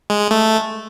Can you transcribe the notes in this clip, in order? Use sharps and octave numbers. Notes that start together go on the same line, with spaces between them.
G#3
G#3
A3